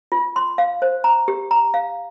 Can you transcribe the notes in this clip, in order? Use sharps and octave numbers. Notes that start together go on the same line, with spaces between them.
F4
C6
F5
C5
A#5
G4
A#5
F5